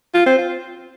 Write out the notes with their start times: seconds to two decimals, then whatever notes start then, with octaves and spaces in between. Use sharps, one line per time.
0.14 F4
0.26 C4
0.38 F4